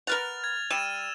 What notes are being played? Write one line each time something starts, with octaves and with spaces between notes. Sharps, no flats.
A#4 B4 F#5 F6 A6 F7
G#6
G3 E6 D#7 E7